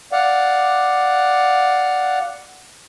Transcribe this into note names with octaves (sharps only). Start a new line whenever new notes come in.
D5 F5 F#5